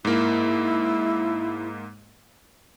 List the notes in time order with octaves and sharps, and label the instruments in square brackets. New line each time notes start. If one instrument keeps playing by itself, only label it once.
[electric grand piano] G#2 A#3 [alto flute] E4